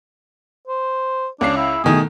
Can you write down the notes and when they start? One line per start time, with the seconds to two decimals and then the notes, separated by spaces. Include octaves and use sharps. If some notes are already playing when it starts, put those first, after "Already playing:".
0.68 C5
1.41 C#2 C#4 D4 C7
1.57 E4
1.84 B2 D#3 A3 G#4